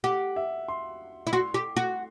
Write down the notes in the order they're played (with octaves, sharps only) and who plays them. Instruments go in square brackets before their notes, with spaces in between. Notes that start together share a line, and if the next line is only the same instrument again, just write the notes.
[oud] G4 [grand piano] F#5
[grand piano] E5
C6
[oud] E4
[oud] F#4 [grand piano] C6
[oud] G4
F#4